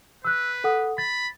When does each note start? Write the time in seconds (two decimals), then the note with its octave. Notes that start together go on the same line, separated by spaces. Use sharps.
0.25 B4 E6 F#6
0.64 A4 F#5 D#6
0.98 B5 A6